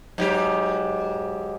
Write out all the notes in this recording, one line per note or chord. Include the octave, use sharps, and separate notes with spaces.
G#2 F#3 G4